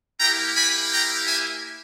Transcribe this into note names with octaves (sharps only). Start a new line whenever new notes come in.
A#3 E4 G4 G5 A#5
G#5 B5
G5 A#5
E5 G#5